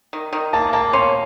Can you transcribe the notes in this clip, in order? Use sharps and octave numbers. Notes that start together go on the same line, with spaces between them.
D#3
D#3
A#3 A5
A#3 A5
C#4 C6